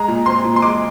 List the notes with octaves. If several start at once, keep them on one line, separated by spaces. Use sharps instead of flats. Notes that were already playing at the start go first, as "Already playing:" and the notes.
Already playing: G#3 A#5
A#2
C4 C6
A#2
C6
G#3 D6